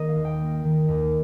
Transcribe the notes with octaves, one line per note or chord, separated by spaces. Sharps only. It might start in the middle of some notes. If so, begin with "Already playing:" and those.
Already playing: D#3 A#3 D#5
F5
D#2
G5
A#3
D#3
D#2